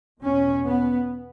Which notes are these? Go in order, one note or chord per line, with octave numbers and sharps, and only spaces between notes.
E2 B2 C#4
B3